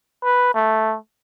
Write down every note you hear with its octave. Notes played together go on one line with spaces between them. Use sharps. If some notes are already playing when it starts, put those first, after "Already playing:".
B4
A3